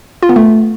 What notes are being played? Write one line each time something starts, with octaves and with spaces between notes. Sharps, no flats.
F4
B3
A3